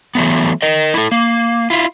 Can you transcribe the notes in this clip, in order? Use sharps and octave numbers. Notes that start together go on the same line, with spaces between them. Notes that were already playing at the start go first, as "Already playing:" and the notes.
E3 F#3 A3 B3
A#4 D#5
E4 A4
A#3
E4 F4